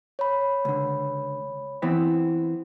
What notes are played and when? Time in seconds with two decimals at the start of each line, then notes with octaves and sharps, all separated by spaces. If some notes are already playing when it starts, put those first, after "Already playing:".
0.19 C#5 B5
0.65 C#2 D3
1.82 E3 B3 C4